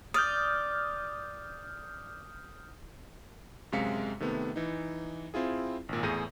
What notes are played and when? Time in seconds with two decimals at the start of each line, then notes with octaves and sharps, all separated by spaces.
0.14 D5 D#6 F6 G6
3.72 F#2 C3 G#3 F5 B6 C#7
4.20 C3 D#3 A3 B3
4.56 E3 D#4
5.34 C4 E4 F4 G#4
5.89 G#1 A#2
6.03 E2 A2 G#4 G6 A#6 D#7